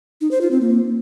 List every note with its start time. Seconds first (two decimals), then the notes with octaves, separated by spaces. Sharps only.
0.21 D#4
0.31 C5
0.41 F4
0.51 C4
0.61 A#3